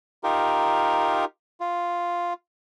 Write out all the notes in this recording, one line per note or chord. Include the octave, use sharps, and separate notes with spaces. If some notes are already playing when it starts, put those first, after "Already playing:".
D#4 F4 G4 A#4
F4